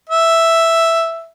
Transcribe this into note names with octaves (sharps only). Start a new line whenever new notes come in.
E5